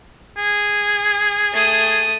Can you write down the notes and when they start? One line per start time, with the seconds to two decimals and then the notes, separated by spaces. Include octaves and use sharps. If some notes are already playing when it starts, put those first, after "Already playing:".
0.37 G#4
1.53 A3 D#6